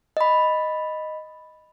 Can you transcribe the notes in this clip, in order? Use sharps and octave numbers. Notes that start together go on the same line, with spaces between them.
D#5 B5